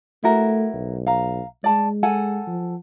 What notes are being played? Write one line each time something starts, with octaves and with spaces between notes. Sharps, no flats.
A3 E4 F#4 A#4
B1
F5 A#5
G#3 D5 A5
A4 F#5 G#5
F3